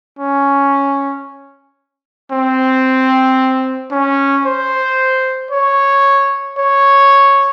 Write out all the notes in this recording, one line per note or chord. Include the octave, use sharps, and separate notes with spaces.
C#4
C4
C#4
C5
C#5
C#5